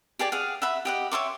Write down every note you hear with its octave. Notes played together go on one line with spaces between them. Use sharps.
G4 G#4 D5 G#5
G#4 F5 F#5
E5 F#5 B5
G4 D#5 F#5
C#5 E5 C6 D6